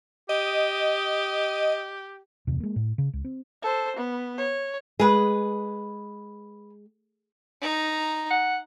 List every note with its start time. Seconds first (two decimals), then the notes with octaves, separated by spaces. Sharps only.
0.29 G4 D#5
2.47 D1 E2 C3 D4
2.60 G#3 A#3
2.76 A2
2.98 C#3
3.13 C#2
3.25 C4
3.62 A4 C5
3.97 B3
4.38 C#5
4.99 G#3 G#4 B4
7.61 D#4 A#5
8.31 F#5